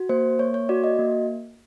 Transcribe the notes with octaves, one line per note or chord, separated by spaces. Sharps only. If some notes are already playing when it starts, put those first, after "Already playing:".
Already playing: F#4
A#3 C5
A#3 C#5
C#5
F#4 D5
D#5
A#3